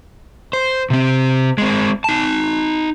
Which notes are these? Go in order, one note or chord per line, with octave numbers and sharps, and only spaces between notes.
C5
C3 C4
G#3 C4
D#4 A5